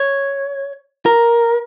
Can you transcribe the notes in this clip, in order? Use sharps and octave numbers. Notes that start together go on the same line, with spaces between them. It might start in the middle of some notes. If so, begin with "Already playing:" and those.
Already playing: C#5
A#4